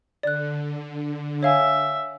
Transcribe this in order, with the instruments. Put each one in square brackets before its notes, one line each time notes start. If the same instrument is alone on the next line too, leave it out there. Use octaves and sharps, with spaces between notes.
[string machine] D3 [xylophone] D5 F#6
[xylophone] C#5 F5 G#5 [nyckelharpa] E5